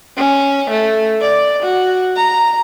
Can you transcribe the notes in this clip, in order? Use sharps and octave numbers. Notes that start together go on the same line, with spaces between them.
C#4
A3
D5
F#4
A#5